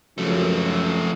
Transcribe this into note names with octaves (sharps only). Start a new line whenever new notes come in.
C#2 F#2 F3 A3